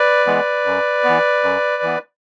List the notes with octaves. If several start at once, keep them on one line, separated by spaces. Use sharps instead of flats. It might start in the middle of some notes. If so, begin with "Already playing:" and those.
Already playing: B4 D5
E3 G#3 B3
F#2
E3 B3
F#2
E3 B3